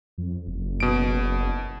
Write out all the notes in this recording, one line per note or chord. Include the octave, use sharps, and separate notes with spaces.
F2
F#1
B2 D7